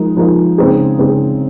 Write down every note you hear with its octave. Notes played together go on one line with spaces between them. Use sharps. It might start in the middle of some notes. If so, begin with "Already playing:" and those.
Already playing: F3 G#3 D#4 A#4
F3 G#3 D#4 A#4
C#3 G#3 C4 D#4 G#4
C#3 G#3 C4 D#4 G#4